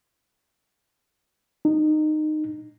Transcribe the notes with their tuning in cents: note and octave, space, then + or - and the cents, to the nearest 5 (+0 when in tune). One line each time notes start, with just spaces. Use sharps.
D#4 -20